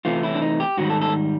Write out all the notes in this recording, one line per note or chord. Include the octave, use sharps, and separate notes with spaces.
C3 E3 A3 F4
E4
D4
D#4
G4
G#2 D#3 G3 F#4
A4
A4